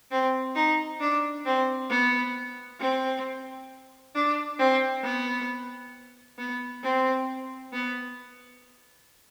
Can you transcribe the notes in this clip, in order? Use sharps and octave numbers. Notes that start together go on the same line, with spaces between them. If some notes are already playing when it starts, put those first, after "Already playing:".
C4
D#4
D4
C4
B3
C4
D4
C4
B3
B3
C4
B3